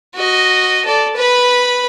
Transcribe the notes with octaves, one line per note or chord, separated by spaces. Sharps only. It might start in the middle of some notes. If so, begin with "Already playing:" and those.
F#4 D#5
A4 D5
B4 B5